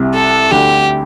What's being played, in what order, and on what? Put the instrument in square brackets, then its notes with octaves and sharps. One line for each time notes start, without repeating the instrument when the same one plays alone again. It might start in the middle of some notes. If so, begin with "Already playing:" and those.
Already playing: [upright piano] C2 C3
[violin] A4
[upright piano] D2 D3 [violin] G4